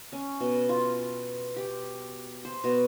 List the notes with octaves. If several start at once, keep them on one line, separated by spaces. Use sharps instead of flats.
C#4
B2
F4
G4
C5
B2